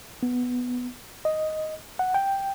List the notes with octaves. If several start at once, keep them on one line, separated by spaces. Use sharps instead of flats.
B3
D#5
F#5
G5